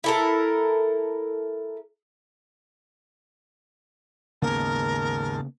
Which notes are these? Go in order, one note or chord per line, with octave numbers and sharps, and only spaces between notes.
E4 A4 A#4
D#2 G#2 C#3 A#3 B3 A#4 A5